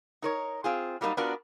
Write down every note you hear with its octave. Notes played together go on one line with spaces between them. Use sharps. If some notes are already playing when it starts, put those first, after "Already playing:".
D#4 A#4 C#5
C4 F4 G#4
F#3 G3 A#3 B3 D#4
B3 D4 F4 F#4 A#4